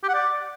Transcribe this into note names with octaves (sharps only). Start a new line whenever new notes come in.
G4
F#5
D5